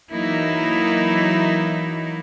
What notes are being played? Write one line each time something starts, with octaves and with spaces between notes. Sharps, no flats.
E3 F#3 A#3 D#4 E4